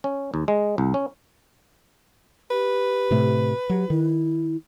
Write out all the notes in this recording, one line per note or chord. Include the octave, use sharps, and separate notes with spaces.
C#4
D#2
G#3
C2
C#4
G4 B4
A2 C3 A3
F#3 G4
D#3 E4